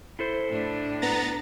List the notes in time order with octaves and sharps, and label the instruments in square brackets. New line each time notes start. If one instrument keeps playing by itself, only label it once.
[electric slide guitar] E4 A4 C5
[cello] A2 D4
[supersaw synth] B3 A#5 A6